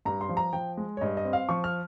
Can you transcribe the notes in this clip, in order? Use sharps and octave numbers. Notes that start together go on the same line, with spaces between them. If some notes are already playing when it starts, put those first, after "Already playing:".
G2 A#5
C6
F3
A#5
F3 G5
G#3
C#5
G2 D#5
D#5
C4
F5
F3 C#6
F6